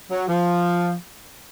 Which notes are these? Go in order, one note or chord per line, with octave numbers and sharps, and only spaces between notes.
F#3
F3